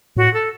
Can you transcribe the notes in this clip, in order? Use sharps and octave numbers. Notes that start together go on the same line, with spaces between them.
A2 F#4
A4